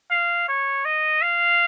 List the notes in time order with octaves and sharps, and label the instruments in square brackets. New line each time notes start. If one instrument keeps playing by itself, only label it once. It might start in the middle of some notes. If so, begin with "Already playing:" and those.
[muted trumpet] F5
C#5
D#5
F5